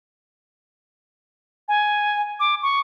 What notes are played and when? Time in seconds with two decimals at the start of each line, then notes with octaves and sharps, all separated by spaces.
1.68 G#5
2.40 D6
2.63 C#6